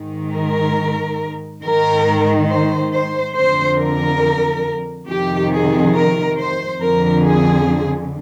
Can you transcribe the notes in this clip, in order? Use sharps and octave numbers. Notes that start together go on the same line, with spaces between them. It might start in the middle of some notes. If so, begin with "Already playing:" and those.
Already playing: G#2 D#3
A#4
G#2 D#3 A#4
C5
C5
F2 D3 C5
A#4
F2 C3 D#3 G4
G#4
A#4
C5
F2 D3 A#4
G#4